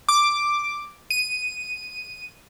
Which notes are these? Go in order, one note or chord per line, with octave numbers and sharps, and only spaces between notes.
D6
D#7